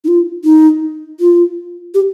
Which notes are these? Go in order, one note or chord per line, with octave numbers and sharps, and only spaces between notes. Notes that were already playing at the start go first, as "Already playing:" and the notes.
D#4
F4
D#4
F4
G4